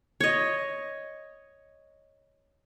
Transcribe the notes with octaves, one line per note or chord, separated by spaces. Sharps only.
C#5 D#5